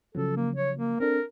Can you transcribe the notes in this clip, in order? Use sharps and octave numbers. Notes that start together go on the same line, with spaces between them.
C#3 F3 F#3 A4
A#3
C#5
A#3
C4 D4 A4 A#4